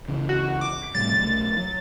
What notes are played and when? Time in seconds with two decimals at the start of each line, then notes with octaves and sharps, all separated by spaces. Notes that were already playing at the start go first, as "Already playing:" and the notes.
0.08 C#2 C#3 E3
0.29 F#4
0.61 D6
0.95 A2 C3 G3 A6
1.20 B1 A3
1.57 F#3